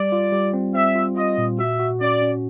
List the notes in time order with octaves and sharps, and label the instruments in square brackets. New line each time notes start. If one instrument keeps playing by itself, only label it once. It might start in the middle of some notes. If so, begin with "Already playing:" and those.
Already playing: [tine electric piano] G3 [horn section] D5
[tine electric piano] F4
G3
C4
[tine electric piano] C4 [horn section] E5
[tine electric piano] F4
[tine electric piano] F4 [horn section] D#5
[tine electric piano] A#2
[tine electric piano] F#4 [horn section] E5
[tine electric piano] F#4
[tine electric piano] C#4 [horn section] D5
[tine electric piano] C#4